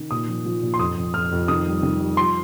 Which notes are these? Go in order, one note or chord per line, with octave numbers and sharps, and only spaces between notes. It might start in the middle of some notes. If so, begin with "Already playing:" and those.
Already playing: D#3
A#2 D#6
F3
F3
A#2
C6
F2 D#6
F2
F2 F6
F2
D#3 D#6
G3
D#3
G3
F3 C6